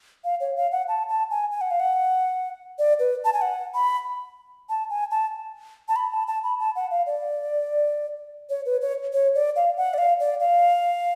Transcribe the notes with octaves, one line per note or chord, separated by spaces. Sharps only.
F5
C#5
F5
F#5
A5
A5
G#5
G#5
F#5
F5
F#5
D5
B4
A5
G#5
F#5
B5
A5
G#5
A5
A5
B5
A5
A5
B5
A5
F#5
F5
D5
C#5
B4
C#5
C#5
D5
F5
F#5
D5
F5
D5
F5